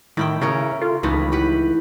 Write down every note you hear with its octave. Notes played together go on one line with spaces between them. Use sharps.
A2 D#3 E4 E5 G5
C#3 C#4 A#4 C#5
F4 A4
C#2 D#3 E3 A3 B5
E4 G4 B4 F#5